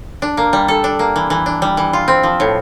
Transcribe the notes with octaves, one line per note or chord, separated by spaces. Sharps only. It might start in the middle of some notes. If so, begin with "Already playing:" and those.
D4
A#3
G3
A4
D4
A#3
E3
E3
D4
G3
E3
F4
C4
F3
A2